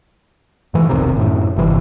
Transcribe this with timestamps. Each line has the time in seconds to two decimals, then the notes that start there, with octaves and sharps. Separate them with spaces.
0.74 G#2 E3
0.89 E1 B1 C3 D#3
1.17 F#2 A2
1.56 G1 C3 E3